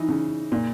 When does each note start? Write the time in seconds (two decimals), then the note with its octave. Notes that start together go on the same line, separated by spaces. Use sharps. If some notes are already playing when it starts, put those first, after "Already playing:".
Already playing: E3 D#4
0.08 C#3
0.52 A#2